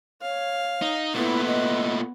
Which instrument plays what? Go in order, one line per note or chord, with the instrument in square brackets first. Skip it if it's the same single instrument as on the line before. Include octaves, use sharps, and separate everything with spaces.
[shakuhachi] C#5 [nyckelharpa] F5
[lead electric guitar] D#4
[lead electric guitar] A#2 A3 [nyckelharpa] B3 B4 [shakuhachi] E4
[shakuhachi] D#5